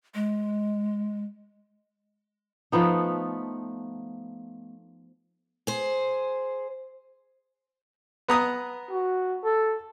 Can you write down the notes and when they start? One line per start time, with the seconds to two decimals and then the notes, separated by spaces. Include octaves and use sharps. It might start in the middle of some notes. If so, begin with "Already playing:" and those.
0.15 G#3
2.72 F3 A3 B3 D#4
5.67 G#4 C5
8.28 B3 A#5 D#6
8.90 F#4
9.44 A4